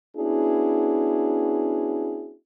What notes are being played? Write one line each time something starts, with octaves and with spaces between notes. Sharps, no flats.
B3 C#4 D4 E4 F#4 G#4